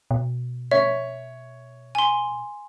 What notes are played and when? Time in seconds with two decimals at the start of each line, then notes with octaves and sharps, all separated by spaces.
0.11 B2
0.71 C#5 E5
1.95 G#5 C6